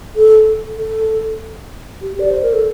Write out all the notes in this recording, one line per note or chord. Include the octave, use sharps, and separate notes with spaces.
A4
A4
G4
D5
C5
A#4
A4